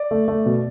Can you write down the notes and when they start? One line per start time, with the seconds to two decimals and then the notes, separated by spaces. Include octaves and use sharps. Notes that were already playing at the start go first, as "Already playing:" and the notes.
Already playing: D5
0.11 A3
0.28 A3
0.46 B2